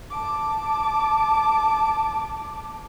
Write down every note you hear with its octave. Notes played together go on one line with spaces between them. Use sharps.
A5 D6